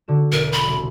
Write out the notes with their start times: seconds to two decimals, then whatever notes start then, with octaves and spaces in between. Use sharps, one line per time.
0.08 D3 F#4 E7
0.32 E1 A#4
0.52 B5
0.67 C2